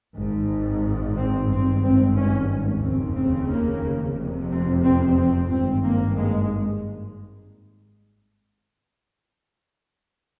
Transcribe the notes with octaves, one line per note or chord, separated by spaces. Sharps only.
G#1 G#2
C4
G#1 G2 C4
C4
C#4
F1 D#2 C#3 C4
C4
A#3
F1 F2 C3
C4
C4
C4
G#1 G2 C4
A#3
G#3